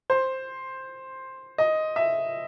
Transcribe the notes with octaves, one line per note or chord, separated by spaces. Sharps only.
C5
D#5
E5